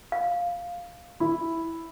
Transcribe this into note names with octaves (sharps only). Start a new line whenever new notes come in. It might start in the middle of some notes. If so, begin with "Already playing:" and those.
F5
E4